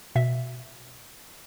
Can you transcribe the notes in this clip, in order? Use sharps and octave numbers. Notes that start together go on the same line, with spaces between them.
B2 E5